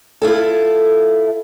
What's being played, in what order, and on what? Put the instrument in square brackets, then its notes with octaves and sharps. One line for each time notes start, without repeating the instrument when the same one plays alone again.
[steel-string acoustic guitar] E4 F4 A4